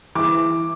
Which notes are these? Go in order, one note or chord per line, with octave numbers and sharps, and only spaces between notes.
E3 D6